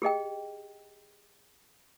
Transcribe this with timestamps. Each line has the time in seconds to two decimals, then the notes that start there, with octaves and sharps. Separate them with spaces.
0.02 G4 G#4 D#5 G5